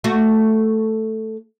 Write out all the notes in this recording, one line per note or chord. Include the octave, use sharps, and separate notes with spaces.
A3 F#4